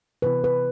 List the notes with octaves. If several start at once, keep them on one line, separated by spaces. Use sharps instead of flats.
C3 E3 B3 E4 B4
B4